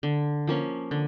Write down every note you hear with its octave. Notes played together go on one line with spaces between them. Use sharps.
D3
F3 A#3 C#4
D3